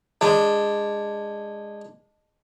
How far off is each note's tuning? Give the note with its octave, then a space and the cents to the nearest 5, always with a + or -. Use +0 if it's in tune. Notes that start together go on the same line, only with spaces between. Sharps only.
G#3 -15 D4 +0